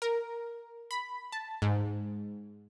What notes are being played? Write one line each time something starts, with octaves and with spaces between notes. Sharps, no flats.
A#4
B5
A5
G#2